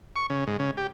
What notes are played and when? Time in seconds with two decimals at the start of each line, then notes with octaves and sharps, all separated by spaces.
0.16 C#6
0.30 C#3
0.47 G#2
0.59 C#3
0.77 G4